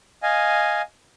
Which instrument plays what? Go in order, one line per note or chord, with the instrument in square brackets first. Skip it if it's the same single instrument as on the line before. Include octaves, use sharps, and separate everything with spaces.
[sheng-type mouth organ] D#5 F5 G#5